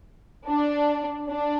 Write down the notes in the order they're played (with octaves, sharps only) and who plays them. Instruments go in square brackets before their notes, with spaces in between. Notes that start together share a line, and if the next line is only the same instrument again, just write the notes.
[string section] D4
D4